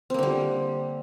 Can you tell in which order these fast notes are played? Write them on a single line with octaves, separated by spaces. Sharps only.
C4 A#3 D3 G3